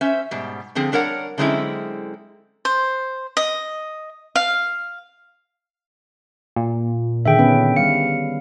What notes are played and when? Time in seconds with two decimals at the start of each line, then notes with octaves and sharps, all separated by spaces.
0.01 C#4 C5 E5
0.31 G#2 B2 G3
0.75 D3 F3 C4 G#4
0.92 G3 D4 A#4 C#5 F#5
1.38 D3 F#3 G#3 C4 C#4 E4
2.65 C5
3.37 D#5
4.35 F5
6.56 A#2
7.25 D3 D#3 G#4 E5 G5
7.39 B3 C#4 B4
7.76 G3 F5 C#7